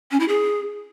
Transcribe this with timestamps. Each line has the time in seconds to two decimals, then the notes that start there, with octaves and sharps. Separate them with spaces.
0.11 C#4
0.20 E4
0.28 G#4